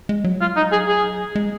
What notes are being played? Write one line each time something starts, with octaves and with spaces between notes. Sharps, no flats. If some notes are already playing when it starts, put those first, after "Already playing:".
G#3
F#3
F4
D#4
G#4
G#4
G#3